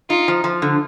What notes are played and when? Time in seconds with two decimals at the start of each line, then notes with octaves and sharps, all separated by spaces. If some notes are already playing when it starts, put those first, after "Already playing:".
0.10 D#4 F4
0.28 F3
0.44 F3
0.62 D3